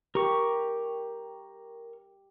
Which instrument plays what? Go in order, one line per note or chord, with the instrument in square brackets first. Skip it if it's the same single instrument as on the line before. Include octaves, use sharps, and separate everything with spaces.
[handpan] G4 [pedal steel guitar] A#4 C#6